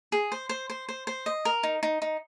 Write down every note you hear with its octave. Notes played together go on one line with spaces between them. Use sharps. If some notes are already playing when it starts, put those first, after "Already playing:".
G#4
C5
C5
C5
C5
C5
D#5
A#4
D#4
D#4
D#4